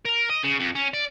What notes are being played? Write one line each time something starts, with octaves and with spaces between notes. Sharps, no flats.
A#4
D#5
C#3
F2
C#4
D5